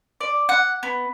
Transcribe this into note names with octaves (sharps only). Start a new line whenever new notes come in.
D5
F#5
B3